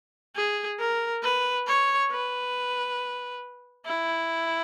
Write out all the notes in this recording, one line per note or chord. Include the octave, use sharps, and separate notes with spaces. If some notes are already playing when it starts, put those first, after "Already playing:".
G#4
A#4
B4
C#5
B4
E4